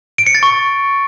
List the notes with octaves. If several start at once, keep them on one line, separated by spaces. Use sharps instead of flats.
D7
C#7
A6
C#6